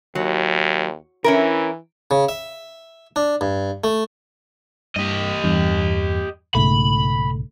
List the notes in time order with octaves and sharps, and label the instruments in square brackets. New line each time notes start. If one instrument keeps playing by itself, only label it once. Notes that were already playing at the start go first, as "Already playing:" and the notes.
[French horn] D#2 [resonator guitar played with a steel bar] F#3
[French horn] E3 [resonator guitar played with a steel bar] C#4 E4 A#4
[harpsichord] C#3
E5
D4
G2
A3
[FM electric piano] G2 B6 [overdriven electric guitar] G4 D#5
[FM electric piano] E2 G2
[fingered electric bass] B1 G#2 C#3 [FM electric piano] A3 [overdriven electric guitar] B5